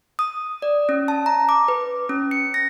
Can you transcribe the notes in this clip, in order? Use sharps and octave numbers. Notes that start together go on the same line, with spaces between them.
D#6
D5
C#4
A5
A#5
D6
B4
C#4
C#7
A#6